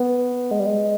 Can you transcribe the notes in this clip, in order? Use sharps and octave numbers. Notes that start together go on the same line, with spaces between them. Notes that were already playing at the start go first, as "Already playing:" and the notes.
Already playing: B3
G#3
G3
G#3